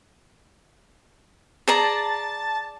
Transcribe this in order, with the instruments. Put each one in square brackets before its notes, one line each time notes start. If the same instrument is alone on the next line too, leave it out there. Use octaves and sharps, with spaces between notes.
[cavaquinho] G#4 D5 A#5 [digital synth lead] A5